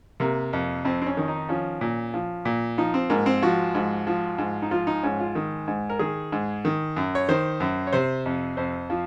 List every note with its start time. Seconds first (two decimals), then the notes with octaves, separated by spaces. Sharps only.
0.20 C3 A#3
0.53 F2
0.85 F2 C4
1.02 C4
1.06 C#4
1.17 D#3
1.28 D#4
1.49 F3 C#4
1.81 A#2
2.14 F3
2.45 A#2
2.78 F3 D#4
2.94 C4
3.10 G#2 A#3
3.26 C4
3.43 F3 F#4
3.75 G#2
4.07 F3
4.38 G#2
4.62 D#4
4.71 F3 F4
4.87 D#4
5.03 G#2 C#4
5.20 F4
5.35 D#3
5.68 G#2
5.90 A#4
5.99 D#3 G#4
6.32 G#2
6.65 D#3
6.96 F#2
7.15 C#5
7.29 D#3 C5
7.60 F#2
7.87 C#5
7.93 C3 C5
8.26 F2
8.57 F2 C5
8.90 F3